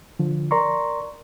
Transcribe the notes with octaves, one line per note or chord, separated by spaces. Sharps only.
D3 F3
A#4 D5 A#5 C6 C#6